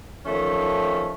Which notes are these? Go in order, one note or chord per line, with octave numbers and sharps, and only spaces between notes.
D#3 F3 A3 C#4